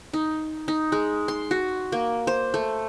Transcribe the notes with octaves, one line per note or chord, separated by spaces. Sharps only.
D#4
D#4
G#3
C6
F#4
A#3
C5
A3